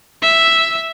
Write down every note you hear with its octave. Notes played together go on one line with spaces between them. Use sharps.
E5